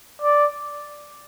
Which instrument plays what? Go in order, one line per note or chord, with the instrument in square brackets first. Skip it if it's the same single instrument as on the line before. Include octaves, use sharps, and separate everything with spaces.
[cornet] D5